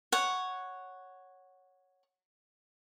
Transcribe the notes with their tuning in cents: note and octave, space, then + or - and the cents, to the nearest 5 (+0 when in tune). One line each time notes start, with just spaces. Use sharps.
C#5 +0 F#5 +0